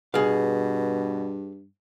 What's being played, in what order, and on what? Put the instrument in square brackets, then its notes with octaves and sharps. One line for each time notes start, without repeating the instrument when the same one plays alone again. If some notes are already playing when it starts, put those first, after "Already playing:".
[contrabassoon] G2 [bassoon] B2 [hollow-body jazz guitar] G#4 F5